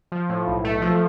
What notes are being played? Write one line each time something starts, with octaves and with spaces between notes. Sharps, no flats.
F3
A2
B1
A3
F3